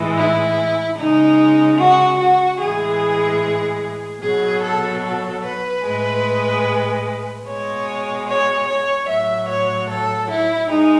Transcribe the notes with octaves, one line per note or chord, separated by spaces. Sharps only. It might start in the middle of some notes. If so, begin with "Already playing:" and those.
Already playing: A2 E3 G#3
E4
C#3 G#3 D#4
F#4
F#4
A2 E3 G#3 G#4
B2 F#3 G#4
A4
A4
B4
A2 G#3
B2 G#3 C#5
C#5
C#5
A2 F#3 E5
C#5
A4
E4
G#3 D#4